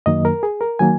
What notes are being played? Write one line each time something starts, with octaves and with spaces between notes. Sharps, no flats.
F#2 D#3 F#3 A#3 D#5
A#4
G#4
A#4
D#3 F#3 A#3 G#5